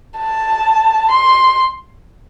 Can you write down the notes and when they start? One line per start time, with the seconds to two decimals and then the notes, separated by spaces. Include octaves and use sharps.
0.19 A5
1.11 C6